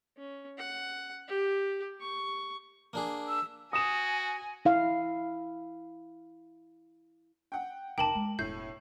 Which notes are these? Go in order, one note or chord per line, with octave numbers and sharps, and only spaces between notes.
C#4
F#5
G4
C#6
A#3 D4 G#4
E6
F#4 G#5 D#6 E7
E4 F5
F#5 G5
F1 D#4 A#4 G5 A5 D6 F#7
G#3
E1 A2 G6 C7